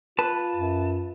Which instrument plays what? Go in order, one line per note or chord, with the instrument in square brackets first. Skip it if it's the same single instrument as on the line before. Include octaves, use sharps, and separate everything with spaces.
[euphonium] F4 [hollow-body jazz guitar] B4 [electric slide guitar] A5
[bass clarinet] F#2